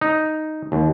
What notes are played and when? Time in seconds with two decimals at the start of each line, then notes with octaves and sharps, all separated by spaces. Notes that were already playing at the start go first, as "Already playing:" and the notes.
0.01 D#4
0.72 D#2